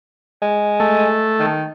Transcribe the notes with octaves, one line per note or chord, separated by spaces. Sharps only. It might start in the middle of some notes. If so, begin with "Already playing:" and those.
G#3
A3
D#3